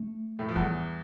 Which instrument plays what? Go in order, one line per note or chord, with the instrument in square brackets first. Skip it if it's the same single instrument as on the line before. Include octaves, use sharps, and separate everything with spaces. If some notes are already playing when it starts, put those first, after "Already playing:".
Already playing: [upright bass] A3
[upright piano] A2 A3
F3
[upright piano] E2 E3 [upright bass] G3